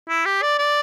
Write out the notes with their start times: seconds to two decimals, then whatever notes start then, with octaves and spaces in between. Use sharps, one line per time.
0.09 E4
0.26 G4
0.42 D5
0.58 D5